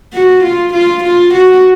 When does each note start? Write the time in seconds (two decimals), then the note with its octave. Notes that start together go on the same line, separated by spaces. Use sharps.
0.13 F#4
0.43 F4
0.73 F4
1.03 F4
1.34 F#4